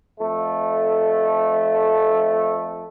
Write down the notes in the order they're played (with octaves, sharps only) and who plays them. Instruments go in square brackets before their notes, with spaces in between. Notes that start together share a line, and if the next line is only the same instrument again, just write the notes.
[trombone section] F2 A3